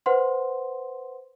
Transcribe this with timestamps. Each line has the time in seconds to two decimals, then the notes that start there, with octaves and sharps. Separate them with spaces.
0.06 B4 C5 F#5 C6